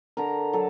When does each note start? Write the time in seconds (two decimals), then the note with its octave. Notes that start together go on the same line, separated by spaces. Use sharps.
0.17 D3 A#4 A#5
0.53 F#3 A4 A5